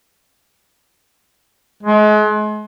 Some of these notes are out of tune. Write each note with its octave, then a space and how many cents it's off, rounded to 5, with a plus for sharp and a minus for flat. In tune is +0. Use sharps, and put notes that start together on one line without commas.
G#3 +35